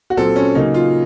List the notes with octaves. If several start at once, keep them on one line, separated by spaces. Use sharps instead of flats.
F#4
A#2 F#3 C4 A4
C#4
C#3 F#3 A#3 D#4
F4